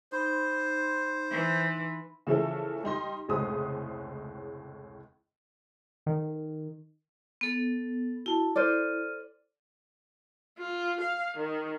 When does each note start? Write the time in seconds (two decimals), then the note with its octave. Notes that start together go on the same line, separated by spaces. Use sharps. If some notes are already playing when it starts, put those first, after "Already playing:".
0.12 D#4 C5 B5 C6
1.31 E3
2.27 C#3 E3 F3 A3 E4 A4
2.84 G3 D#4 C6 A#6
3.28 F1 C#2 A2 G#3 C5 D#6
6.06 D#3
7.41 B3 A4
8.26 E4 F#4 A5
8.56 A4 C5 D5 F6 D#7
10.59 F4
11.01 F5
11.37 D#3